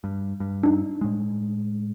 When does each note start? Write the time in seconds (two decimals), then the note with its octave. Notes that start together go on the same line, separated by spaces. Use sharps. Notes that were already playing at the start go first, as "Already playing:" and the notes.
0.04 G2
0.40 G2
0.63 D4 D#4
1.01 A2 G#3